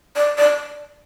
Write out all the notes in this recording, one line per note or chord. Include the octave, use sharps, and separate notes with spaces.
D5
D5